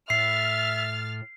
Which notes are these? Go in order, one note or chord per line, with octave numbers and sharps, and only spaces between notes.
A2 E5 F6 A6 C7